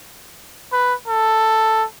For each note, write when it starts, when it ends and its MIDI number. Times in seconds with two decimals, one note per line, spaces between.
0.73 0.94 71
1.08 1.85 69